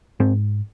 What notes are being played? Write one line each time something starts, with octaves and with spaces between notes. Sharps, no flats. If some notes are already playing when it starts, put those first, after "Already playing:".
G#2 C4